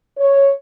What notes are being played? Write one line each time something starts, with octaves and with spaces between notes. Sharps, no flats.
C#5